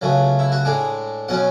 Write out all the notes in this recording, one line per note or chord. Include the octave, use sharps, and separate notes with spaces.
C#2 C#3 F#3 A3
E4
F#4
A2 G#3 D4 G#4
B2 F#3 C#4 F#5